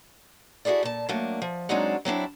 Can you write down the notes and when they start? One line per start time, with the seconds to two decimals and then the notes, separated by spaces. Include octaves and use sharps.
0.65 E4 F#4 G#4 A4 D5
0.83 A#2 A5
1.09 F#3 A3 A#3 D4
1.42 F3
1.69 F#3 G#3 C4 D4 D#4 F#4
2.05 F#3 C4 D4 E4